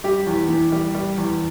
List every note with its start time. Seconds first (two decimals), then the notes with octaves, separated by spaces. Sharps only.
0.04 G3 G4
0.27 E2
0.49 E3
0.72 G3
0.95 G3
1.18 E2